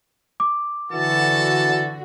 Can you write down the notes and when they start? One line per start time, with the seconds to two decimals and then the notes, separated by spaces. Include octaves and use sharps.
0.40 D6
0.92 D3 E3 F#4 A4 A5